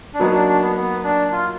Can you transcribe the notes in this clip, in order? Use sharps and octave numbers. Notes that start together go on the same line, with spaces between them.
D4
F#3 A#3 B3 D#4 F#4
D4
D4
B3
B3
D4
F4